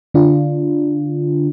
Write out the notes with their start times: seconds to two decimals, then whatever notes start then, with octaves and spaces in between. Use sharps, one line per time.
0.14 D3 D4 F4